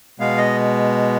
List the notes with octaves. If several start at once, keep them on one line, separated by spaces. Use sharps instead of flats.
B2 G#3 B3 F5
D#5